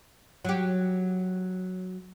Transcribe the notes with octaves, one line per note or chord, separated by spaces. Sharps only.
F#3 G4